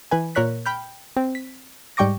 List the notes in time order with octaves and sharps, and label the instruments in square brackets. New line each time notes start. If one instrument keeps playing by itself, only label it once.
[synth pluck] E3 B4 G#5
A#2 A#4 C#5 F#6 B6
G5 B5 F6 G6
C4
B6
G#2 G3 G5 C#6 D6 A#6